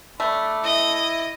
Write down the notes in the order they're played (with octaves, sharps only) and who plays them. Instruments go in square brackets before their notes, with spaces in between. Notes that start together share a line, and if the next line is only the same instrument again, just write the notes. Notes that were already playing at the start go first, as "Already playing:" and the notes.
[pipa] A3 [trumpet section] D4 B5
[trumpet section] E4 [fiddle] D#5